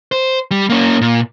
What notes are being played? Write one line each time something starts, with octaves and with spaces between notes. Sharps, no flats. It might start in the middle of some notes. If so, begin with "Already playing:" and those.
C5
G3
A#3 C#4
A#2